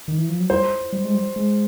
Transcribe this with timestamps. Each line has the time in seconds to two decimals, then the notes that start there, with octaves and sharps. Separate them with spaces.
0.08 D#3
0.18 E3
0.29 F3
0.40 F#3
0.50 G3 C5
0.93 G3
1.04 G#3
1.14 G3
1.36 G#3